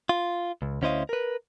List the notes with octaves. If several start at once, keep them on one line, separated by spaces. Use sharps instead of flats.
F4
C#2
D2 C#4 E4 C5 D#5 F5
A#4 B4